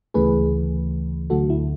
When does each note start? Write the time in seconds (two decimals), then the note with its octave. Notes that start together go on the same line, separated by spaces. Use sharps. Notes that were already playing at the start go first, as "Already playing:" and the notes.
0.14 D2 C#3 E3 A3 G#4 B4
1.30 D2 D3 F#3 A3 F#4 A4
1.50 E4